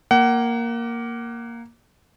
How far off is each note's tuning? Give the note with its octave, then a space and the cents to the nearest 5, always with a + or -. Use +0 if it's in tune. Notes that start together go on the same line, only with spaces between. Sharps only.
A#3 +0 F#5 +30